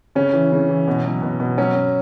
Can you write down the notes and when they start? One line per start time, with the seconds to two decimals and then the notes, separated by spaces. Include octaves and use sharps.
0.15 C#3 C#4
0.33 E3
0.52 C#3
0.69 E3
0.88 B2
1.05 F#3
1.22 B2
1.40 B2
1.58 F#3 C#4
1.75 B2